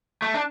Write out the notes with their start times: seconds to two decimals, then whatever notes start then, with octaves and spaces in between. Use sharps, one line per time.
0.22 A3
0.34 D4